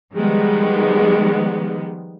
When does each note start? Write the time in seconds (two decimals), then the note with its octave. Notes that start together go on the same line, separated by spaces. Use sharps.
0.14 D#3 F3 G3 G#3 B3